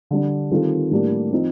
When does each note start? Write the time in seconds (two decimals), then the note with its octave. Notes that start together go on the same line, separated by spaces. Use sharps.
0.11 D3 G3 D4
0.51 D#3 G3 C4 F4 A4
0.91 A2 G3 A#3 D4 G4
1.32 F3 C4 D#4